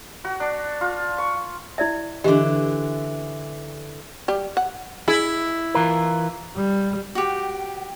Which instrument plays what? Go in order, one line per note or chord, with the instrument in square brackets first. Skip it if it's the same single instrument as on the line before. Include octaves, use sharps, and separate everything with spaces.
[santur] F#4
D4
F4
C#6
[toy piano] E4 D5 E5
[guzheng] D3 E3 [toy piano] G4 D#5
[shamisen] G3 G4
F#5
[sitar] E4 [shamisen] G#4
[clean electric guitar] E3 F4 A#4
[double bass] G3
[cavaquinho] F#4 G4 [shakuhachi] G5